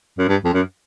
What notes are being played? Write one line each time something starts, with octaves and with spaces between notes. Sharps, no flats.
F#2
G2
F2
F#2